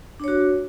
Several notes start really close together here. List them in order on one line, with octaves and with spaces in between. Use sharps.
D4 C#5 F#4